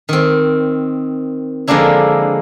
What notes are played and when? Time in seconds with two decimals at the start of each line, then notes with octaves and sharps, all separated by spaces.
0.09 D#3 C4
1.67 D3 F3 G#3 A#3 D4 E4